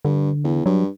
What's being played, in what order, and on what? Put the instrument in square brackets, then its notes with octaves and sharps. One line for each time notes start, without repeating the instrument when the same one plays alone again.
[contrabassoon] G2 [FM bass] D3
[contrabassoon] E2
[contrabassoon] G2 [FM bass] F#3